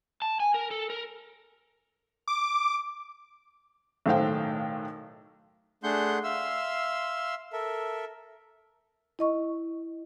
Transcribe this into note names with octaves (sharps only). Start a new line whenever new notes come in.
A5
G#5
A#4
A4
A#4
D6
B1 A2 D#3 C5 F5 G5
A3 D4 G#4 F#5 C6 G6
E5 F5 C6 E6
A4 A#4 E5
E4 D#5 C#6